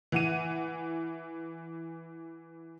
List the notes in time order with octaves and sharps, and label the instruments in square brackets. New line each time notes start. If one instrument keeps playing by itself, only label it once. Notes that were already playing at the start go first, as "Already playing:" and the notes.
[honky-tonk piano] E3 F#5 D#7